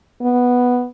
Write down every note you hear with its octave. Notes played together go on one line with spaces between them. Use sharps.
B3